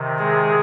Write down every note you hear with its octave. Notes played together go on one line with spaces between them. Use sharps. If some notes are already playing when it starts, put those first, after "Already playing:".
Already playing: C3 D#3
G#3 G#4